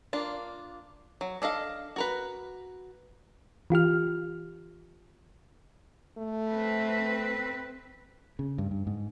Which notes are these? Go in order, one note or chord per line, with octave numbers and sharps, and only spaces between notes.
A#3 D4 F4
F#3
D4 A4 D#5 F5
F#4 A#4 B4
E3 F4 G4 F6
A3
C4 B4
C#3
G2
G2
G#2